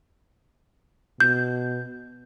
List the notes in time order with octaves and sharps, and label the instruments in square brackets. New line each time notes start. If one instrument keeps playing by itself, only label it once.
[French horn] B2 [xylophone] G6